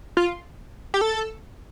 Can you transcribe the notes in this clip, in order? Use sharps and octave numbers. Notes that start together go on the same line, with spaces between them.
F4
G4
A4